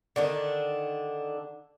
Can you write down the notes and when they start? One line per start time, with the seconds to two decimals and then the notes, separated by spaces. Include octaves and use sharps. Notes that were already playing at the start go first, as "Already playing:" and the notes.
0.16 D3 D#3 D4